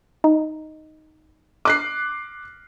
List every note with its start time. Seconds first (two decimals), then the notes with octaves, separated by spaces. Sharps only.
0.24 D#4
1.65 D6 F#6 C7